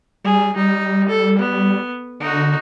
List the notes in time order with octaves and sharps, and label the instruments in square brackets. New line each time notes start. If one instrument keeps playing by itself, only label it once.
[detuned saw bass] G3 [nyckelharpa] G#4
[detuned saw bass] G3 [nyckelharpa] D#4
[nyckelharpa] A4
B3
[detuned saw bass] D3 [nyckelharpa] D#4 F#4